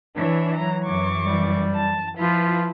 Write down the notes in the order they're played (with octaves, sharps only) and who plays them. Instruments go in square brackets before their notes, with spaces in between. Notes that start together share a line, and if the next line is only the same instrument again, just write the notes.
[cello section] E3 [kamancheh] D4 C#5
[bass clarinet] F#3 [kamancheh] A#5
[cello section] F#2 E3 [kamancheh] C#6 D6
[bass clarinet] G3
[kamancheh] A5
[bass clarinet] F3 [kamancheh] E4 [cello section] F4 B4